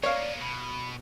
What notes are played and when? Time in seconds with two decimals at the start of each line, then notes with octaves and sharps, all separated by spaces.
0.03 A#3 B3 C#5 D5 F5
0.41 B2 B5